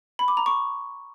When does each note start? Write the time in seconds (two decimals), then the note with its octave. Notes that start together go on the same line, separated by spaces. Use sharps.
0.19 B5
0.28 D6
0.37 A#5
0.46 C#6